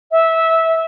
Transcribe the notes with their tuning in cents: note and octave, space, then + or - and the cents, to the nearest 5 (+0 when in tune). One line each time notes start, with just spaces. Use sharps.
E5 -15